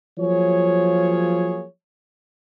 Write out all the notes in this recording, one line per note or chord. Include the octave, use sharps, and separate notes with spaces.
F3 F#3 A#3 G#4 C#5